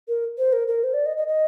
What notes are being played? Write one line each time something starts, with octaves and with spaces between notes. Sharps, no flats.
A#4
C5
A#4
A#4
C5
D5
D#5
D#5
D#5